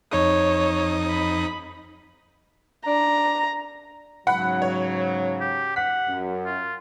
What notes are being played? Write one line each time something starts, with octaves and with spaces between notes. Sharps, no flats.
F2 D#4 C#5 D#6
B5
D4 A#5
G#2 C#3 F#3 F#5 B5
C#5
G4
F#5 B6
F#2
F4